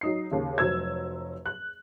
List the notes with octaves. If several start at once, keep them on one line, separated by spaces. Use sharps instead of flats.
F#3 D#4 C7
D#2 C#3
F1 F#3 C5 E6 G#6
F#6